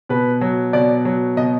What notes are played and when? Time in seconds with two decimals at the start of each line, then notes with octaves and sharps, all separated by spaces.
0.09 B2 B4
0.41 F#3
0.73 B2 D5
1.05 F#3
1.37 B2 D#5